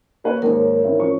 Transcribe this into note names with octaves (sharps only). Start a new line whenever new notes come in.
A#3 B4 C#5
D#2 G#2 A#4 C#5
G#1 E4
A1 F3 C#6